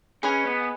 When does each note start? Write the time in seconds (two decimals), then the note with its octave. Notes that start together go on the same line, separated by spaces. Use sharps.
0.23 C#4 G#4 B4 D#5 G#5
0.45 B3